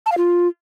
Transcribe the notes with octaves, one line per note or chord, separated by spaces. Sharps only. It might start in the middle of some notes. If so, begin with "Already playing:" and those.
A5
F5
F4